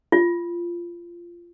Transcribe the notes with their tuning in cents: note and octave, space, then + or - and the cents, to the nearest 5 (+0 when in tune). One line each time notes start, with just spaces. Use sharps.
F4 -15